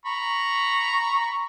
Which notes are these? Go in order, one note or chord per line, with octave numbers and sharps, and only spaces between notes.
A#5 B5 C#6